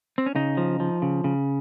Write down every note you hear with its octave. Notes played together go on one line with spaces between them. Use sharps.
C4
C#4
C#3 D#4
F3
F3
C#3
C#3